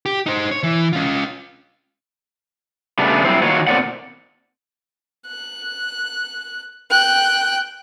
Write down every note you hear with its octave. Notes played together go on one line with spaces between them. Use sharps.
G4
D#4 C5
C#5
E3
C#4 F4
C#3 G3 A3 B3 D4
F#3 G3 C4 E4 C5
D#3 F#3 A#3 F4 F#4 C#5
B2 A#3 C4 E4 D5 F#5
F#6
G5 F#6